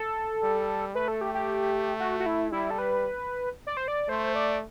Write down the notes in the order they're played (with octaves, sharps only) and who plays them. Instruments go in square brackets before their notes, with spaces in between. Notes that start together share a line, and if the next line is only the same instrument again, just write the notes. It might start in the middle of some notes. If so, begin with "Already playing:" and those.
Already playing: [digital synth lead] A4
[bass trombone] G3
[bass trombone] A3 [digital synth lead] B4
[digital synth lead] A4
G4
G4
F#4
F#4
E4
[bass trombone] G3 [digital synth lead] E4
[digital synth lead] A4
B4
D5
C5
D5
[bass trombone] A3 [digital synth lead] C5
[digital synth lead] D5